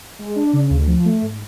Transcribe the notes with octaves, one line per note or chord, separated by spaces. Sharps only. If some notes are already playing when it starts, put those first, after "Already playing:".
G#3
D4
C#3
D2
F3
A3
G#2